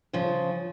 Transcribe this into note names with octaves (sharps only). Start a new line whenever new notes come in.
C#3 F3